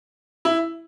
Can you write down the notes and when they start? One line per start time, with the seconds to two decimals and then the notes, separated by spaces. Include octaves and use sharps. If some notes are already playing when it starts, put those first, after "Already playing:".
0.45 E4